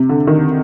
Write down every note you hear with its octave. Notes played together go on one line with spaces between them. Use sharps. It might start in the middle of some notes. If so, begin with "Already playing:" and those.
Already playing: C3
D3
D#3